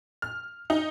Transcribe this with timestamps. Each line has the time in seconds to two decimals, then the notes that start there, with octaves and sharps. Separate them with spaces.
0.22 F6
0.70 D#4